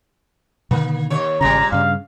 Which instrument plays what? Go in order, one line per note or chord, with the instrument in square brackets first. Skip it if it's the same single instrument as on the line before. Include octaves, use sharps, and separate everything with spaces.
[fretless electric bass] B2 D3 D#3 [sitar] A#3
[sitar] D#2 C#5
[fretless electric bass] G#1 C#3 [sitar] D#2 A#2 G3 [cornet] A#5
[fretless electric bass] G2 C#3 [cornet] F5